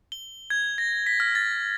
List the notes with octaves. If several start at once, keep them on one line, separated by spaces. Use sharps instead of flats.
G7
G#6
A#6
B6
F6
A6